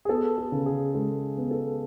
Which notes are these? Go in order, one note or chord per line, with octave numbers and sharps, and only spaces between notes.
G#4
B3 A4
A4
C#3
G#4
G#3 A4
B3
A4